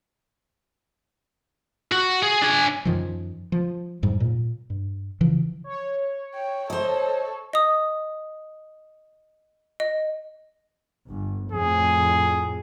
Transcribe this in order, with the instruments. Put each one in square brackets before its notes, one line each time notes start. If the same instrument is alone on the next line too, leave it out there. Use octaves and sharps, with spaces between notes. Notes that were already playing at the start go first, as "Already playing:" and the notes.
[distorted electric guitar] F#4
G#4
D4 G#5
[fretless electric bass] F#2 D#3 F3
F3
F2 G#2 G3
A#2
G2
C#3 E3 F3
[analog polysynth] C#5
[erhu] G5
[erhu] A4 [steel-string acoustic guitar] C5 D#5
[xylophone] D#5 D#6
D#5
[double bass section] G1
[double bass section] F2 A2 [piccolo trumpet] G#4